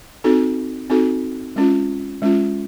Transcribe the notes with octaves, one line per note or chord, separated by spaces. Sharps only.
C4 D#4 F#4 A4
C4 D#4 F#4 A4
G#3 C#4 F4
G#3 C#4 F4